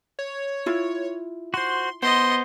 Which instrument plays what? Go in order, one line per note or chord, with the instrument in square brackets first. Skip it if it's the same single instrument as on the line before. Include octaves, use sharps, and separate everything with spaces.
[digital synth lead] C#5
[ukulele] E4 F4
[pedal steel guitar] F#4 C5 [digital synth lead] C6
[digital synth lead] B3 [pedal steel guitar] C5 [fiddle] D#5 C6